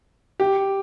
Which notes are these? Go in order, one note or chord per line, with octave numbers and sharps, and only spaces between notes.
G4